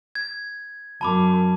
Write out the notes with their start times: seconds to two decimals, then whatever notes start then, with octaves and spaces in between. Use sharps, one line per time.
0.15 G#6
1.01 F#2 A5 B5 D6